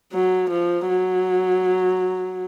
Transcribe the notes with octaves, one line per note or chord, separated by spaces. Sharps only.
F#3
F3
F#3